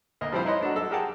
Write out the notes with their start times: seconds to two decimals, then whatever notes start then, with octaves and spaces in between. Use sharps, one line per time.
0.21 D2 A#3 D#5
0.32 F3 G3 C4 E4 C5 F5
0.45 D#4 E4 B4 C#5 D#5 C6
0.61 A3 D4 D#4 F#4
0.74 F#3 A4 D#5
0.91 G4 G#4 A#4 F#5 G5 A5